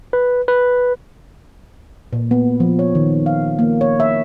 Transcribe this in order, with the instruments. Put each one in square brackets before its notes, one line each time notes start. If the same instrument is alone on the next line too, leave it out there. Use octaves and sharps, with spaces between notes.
[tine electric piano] B4
B4
[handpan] A#2
B3
F3
C#5
D#3
F5
A#3
C#5
E5